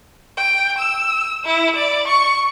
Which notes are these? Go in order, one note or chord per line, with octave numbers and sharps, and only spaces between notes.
G5
E6
E4
D5
C#6